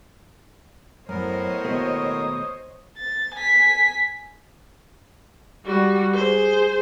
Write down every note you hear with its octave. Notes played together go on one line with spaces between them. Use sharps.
F#2 A2 B3 A#4 C5 C#5 D#5
D#2 B2 A3 D#6
A6
G#5 B6
G3 F#4
G#4 C5